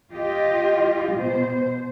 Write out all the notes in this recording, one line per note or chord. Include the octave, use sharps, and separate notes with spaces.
F4 G4 D#5
B2 C5